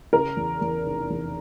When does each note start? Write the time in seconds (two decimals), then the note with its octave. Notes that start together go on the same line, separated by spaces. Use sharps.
0.13 C#3 A#4
0.37 E2
0.61 E2
0.86 F1
1.10 E2